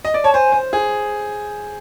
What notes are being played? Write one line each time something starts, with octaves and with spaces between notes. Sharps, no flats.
D#5
D5
C#5 A5
C5 G#5
C5
G#4